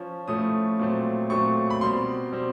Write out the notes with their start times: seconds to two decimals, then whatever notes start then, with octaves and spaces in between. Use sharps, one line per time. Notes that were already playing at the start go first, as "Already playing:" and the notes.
Already playing: F3 C#4
0.28 A2 F3 A3 C#4 D#6
0.79 A#2 F#3 A3 C4
1.30 A#2 F#3 A3 C4 C#6
1.70 B5
1.81 B2 G3 C4 C6
2.32 B2 G3 C4